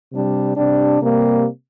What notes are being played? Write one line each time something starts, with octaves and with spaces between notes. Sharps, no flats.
C3 G3 D4
C3 G3 D4
C3 G3 A#3